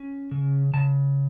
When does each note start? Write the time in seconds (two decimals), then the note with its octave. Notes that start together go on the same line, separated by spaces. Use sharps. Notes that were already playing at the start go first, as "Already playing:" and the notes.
Already playing: C#4
0.31 C#3
0.74 C#3 A5